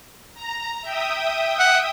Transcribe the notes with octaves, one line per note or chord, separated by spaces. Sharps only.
A#5
E5 G5 D#6
F#5